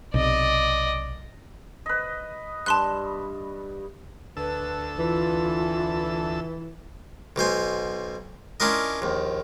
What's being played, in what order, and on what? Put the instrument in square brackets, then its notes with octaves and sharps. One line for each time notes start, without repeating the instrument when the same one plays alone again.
[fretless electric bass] B1 C3 [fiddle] D5 D#5
[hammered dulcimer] B4 D#5
[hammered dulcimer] G2 [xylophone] A5 C6 F#6
[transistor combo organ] D2 A4 E6 [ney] B4
[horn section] E3 [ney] F4
[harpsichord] B1 B2 C5 G#5
C#4 D4 E4 F4 A#4 D#5
A#1 D#2